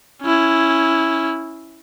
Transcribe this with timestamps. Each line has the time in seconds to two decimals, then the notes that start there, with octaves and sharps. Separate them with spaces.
0.22 C#4 E4